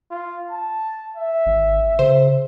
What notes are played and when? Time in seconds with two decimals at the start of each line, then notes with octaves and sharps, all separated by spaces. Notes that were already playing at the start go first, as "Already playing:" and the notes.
0.10 F4
0.51 A5
1.16 E5
1.46 G#1
1.99 C#3 C5